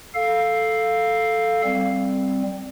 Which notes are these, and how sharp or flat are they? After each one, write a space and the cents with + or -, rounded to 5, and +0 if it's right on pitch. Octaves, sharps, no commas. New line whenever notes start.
A4 +0 F5 +0
G3 +0 C4 +0